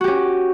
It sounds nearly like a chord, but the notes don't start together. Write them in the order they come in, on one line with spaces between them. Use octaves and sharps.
F#4 G4 C#4